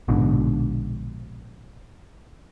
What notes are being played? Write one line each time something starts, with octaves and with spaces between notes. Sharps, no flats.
A#1 G#2 B2 D3